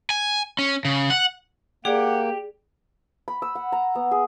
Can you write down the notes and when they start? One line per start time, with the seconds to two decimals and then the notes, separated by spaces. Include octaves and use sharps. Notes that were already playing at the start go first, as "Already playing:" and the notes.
0.10 G#5
0.59 C#4
0.85 C#3
1.10 F#5
1.85 A#3 G4 G#4 D5 F#5
3.28 B5
3.42 E6
3.55 F#5
3.72 A#5
3.95 B3
4.11 G#4